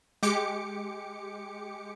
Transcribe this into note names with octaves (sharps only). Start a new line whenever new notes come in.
G#3 G4 D6 C#7